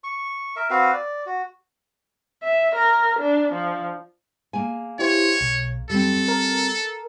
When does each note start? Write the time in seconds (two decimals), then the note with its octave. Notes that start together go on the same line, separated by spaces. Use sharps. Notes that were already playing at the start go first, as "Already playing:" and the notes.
0.04 C#6
0.56 A#4 E5
0.70 C4 F#4 B4 F5
0.93 D5
1.26 F#4
2.44 E5
2.76 A#4
3.20 D4
3.54 F3
4.53 A#3 G#4 G#5
4.99 E4 G4 C5 C#5
5.41 B1
5.90 F#2 G3 C4 A4
6.28 A#4